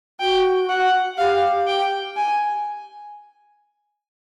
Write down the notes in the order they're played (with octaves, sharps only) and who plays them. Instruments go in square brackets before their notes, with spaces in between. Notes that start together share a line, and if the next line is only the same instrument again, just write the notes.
[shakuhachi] F#4 [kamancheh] G5
[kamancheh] F#5
[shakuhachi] G4 [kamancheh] F5
[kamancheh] G5
G#5